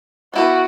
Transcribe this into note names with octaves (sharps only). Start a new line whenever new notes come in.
B3 E4 F#4 G4 B4